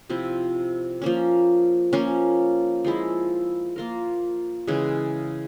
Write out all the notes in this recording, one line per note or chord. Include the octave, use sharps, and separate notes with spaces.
C3 F3 C4 E4
F3 A#3 C#4
F3 A#3 C#4
F3 G#3 E4
A#3 F4 A#4
C#3 E3 G#3